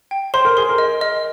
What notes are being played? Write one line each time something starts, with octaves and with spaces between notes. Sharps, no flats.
G5
C5 C6
A#4
G#4 C6
A#4
D#5
D#5